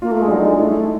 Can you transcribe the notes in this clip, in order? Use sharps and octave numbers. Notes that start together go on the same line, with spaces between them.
A#3 F4
A3
G#3
D4
F#3 D#4
G#3
A3 E4